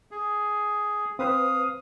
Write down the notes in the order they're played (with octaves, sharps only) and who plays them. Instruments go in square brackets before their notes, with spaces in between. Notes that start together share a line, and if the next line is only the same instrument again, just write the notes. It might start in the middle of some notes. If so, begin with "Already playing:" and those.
[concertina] G#4
[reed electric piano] C4 B4 C5 [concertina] F5 D#6